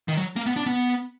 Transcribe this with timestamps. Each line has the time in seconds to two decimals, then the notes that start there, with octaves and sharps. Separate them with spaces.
0.08 D#3
0.17 F#3
0.36 A#3
0.46 B3
0.56 D4
0.66 B3